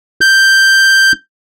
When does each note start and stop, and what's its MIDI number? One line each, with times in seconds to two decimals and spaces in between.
0.21 1.12 91